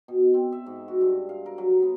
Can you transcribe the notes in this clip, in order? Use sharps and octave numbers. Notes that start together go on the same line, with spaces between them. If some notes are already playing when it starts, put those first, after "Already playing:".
B2
C4
E5
G#2
F#4
G2
F5
A#4
F#3
B3